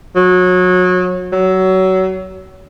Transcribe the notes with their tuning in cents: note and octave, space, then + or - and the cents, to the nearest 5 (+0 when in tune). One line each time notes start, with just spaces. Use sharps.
F#3 -25
F#3 +25